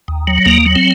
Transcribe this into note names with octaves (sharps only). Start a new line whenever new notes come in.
D#2
F#3
D#2 A#3
F#3
C4